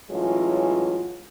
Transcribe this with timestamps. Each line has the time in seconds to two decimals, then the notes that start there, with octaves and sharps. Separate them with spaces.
0.11 A2 E3 F#3 G#3 C#4 F4